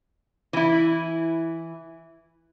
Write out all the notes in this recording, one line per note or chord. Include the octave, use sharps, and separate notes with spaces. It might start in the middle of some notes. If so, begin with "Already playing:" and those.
E3 E4